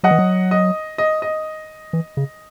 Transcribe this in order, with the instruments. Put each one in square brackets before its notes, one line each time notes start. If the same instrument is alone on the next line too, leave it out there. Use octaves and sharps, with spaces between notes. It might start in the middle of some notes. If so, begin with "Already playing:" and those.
[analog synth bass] F#3 [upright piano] D#5 F#5
[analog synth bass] E3
F#3
[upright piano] D#5
D#5
D#5
[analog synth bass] E3
C#3